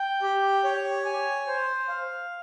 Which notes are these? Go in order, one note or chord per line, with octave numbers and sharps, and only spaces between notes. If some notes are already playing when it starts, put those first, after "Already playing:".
Already playing: G5
G4
C#5
G#5
C5
F5